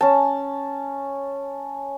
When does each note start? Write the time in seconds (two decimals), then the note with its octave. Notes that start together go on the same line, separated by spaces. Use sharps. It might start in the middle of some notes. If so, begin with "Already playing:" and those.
0.01 C#4 A5